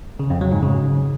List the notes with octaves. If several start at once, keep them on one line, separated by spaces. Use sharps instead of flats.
C#3
F2
F#3
G#2
C#3